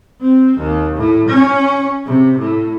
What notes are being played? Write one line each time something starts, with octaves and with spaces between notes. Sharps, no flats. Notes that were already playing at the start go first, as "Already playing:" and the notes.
C4
D#2
A2
C#4
C3
A2